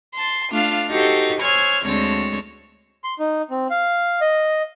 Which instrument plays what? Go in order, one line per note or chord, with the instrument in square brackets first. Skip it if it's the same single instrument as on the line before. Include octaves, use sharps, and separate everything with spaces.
[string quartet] A5 C6
A3 D4 F4 F5
D#4 F#4 G4 A4 C5
C5 C#5 G#5 E6 F6 G#6
D2 D3 G#3 C4 C#5 A5
[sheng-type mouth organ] C6
D#4
C4
F5
D#5